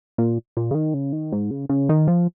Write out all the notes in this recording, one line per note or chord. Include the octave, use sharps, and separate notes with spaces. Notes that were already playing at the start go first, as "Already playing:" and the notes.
A#2
A#2
C#3
D#3
C#3
D#3
G#2
C#3
C#3
D#3
F3